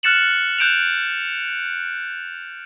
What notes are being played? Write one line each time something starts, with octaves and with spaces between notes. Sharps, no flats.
F6 F#6 A6 C#7 E7 F#7
F#6 G6 D7 E7 F7